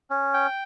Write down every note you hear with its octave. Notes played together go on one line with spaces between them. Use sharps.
C#4
G5